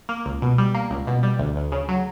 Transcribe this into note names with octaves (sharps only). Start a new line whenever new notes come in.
A#3
C#2
B2
G3
A#3
C#2
B2
G3
D2
D2
C#3
F#3